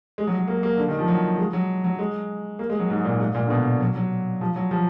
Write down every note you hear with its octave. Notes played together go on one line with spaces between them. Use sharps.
G#3
F#3
F#3
A#3
A#3
D3
D#3
F3
F#3
G#3
F#3
F#3
G#3
A#3
G#3
F#3
G#2
A#2
G#2
A#2
D3
B2
F#3
F#3
F3
F#3
F3